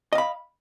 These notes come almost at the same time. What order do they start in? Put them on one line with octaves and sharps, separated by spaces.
D#5 F5 B5